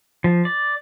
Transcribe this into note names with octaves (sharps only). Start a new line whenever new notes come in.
F3
D5